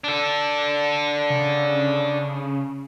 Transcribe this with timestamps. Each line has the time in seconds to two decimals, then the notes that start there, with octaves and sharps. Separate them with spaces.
0.04 D4 A4
1.30 C#3